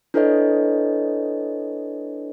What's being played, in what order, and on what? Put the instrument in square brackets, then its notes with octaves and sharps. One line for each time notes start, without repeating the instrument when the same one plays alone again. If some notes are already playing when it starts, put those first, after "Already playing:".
[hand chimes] D4 E4 A4 B4 C#5 D#5